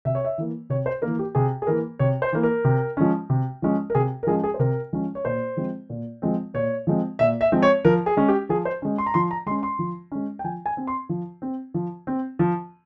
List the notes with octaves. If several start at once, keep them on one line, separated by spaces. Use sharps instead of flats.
C3 E5
C#5
E5
E3 A#3
C3 C#5
C5
E3 A#3 A#4
G4
C3 G#4
G#4
E3 A#3 A#4
C3 C#5
C5
E3 A#3
A#4
C3
F3 G#3 C#4
C3
F3 G#3 C#4
A#4
C3 G#4
A#4
F3 G#3 C#4 G#4
G#4
C5
C3 A#4
F3 G#3 C#4
C#5
A#2 C5
F3 G#3 C4
A#2
F3 G#3 C4
A#2 C#5
F3 G#3 C4
A#2 E5
E5
F3 G#3 C4
C#5
F3 A#4
G#4
G#3 C#4
G4
F3 G#4
C5
G#3 C#4
C6
A#5
F3 C6
A#5
G#3 C#4 C6
C6
F3
G#3 C#4
G5
F3 G#5
G#5
C4
C6
F3
C4
F3
C4
F3